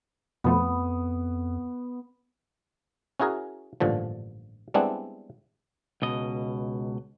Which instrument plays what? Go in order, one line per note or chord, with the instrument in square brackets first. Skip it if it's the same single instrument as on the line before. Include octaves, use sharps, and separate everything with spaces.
[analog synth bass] F2 [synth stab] B2 F3 A3 [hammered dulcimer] B3
[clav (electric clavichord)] C#4 E4 F#4 G#4 A#4
A1 G2 A#2 D3 F3
G3 G#3 B3 C4 D4 E4
[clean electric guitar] C#2 B2 D#5